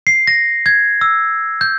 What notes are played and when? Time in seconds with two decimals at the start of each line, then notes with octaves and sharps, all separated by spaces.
0.07 C7
0.27 A#6
0.66 G#6
1.01 E6
1.61 G6